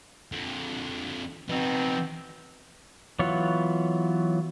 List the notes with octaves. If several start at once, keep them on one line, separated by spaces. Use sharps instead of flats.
F2 D3
B2 F3 C4 D#4
E3 F#3 B3 F4 C#5